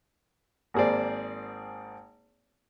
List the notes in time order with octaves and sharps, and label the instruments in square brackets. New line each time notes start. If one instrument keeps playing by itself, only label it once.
[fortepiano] G#1 A#3 G#4 C5 D5